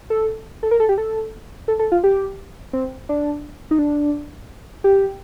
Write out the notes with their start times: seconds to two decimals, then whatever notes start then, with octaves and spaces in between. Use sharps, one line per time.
0.10 A4
0.63 A4
0.71 A#4
0.80 A4
0.89 G4
0.98 A4
1.68 A4
1.79 A4
1.92 F4
2.04 G4
2.73 C4
3.09 D4
3.71 D#4
3.79 D4
4.84 G4